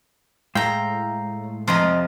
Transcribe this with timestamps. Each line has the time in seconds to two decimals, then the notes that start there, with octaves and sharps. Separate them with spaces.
0.55 A2 G#3 E5 F5 G5 A#5
1.67 F2 C3 F3 D#5 A#5 C6